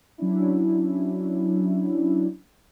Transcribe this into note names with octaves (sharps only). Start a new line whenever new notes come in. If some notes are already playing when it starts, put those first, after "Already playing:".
F#3 C#4 D4 E4